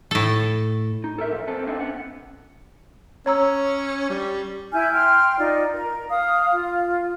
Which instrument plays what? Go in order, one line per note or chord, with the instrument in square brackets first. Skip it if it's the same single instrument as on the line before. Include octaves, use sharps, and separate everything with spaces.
[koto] A2 A4
[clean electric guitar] D#4
A4 A#4 E5
A#2 F3
B3 C4 A4
A#3 C4 D4 D#4 B4 E5
B3 C#4 F#5
[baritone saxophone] C#4 [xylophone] C#5 A#5 E6
[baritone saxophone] G3
[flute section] E4 G#5 F6 G6
G5 C6 F6
D#4 F4 D5
A#4
F5 D#6
F4